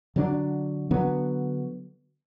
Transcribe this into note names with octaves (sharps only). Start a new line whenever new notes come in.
D3 F#3 A3 D4
D3 F#3 B3 D4